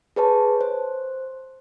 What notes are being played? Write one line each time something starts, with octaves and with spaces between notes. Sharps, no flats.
G#4 B4 C#5 A5
C5